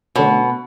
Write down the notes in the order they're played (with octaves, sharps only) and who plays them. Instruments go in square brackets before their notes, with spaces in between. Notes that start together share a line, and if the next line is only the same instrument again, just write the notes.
[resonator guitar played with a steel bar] B2 [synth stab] D3 A3 C#4